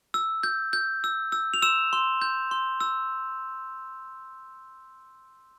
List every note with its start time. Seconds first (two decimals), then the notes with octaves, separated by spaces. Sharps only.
0.14 E6
0.43 G6
0.73 G6
1.04 E6
1.32 E6
1.54 F7
1.62 C6 E6 E7
1.93 C6
2.22 G6
2.51 C6
2.81 E6